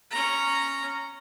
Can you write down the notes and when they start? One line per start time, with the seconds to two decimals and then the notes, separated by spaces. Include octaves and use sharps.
0.11 C#4 A#5